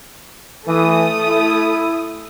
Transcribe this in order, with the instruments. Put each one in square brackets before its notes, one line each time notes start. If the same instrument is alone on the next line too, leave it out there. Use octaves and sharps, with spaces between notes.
[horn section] E3 [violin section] A3 D#6
[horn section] E4